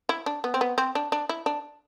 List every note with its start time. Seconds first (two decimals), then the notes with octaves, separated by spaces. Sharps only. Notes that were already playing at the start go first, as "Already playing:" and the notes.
0.09 E4
0.26 D4
0.44 B3
0.54 C4
0.61 B3
0.78 C4
0.95 D4
1.12 D4
1.29 E4
1.46 D4